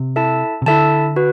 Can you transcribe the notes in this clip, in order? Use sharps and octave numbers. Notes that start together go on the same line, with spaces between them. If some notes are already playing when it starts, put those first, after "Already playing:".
Already playing: C3
E4 A4 E5 A5
C3
D3 E4 A4 E5 A5
F#4 B4